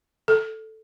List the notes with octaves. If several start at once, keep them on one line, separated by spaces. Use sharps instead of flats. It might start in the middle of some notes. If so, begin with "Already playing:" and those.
A4